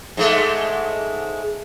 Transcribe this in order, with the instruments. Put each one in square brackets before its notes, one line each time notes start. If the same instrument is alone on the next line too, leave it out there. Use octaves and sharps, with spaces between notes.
[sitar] G#2 G#3 A3